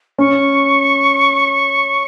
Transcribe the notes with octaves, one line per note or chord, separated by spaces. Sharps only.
C#4 C#6